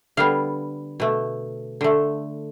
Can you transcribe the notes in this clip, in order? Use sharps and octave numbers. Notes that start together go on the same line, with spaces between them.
D3 G3 B3 F5
B2 A3
D3 A3